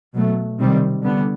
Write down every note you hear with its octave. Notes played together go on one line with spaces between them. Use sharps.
B2 F#3 A3
C3 D#3 G3 C4
D3 G3 B3